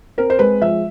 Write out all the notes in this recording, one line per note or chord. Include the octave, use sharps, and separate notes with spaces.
C4 A#4
C5
G#3 B4
F3 E5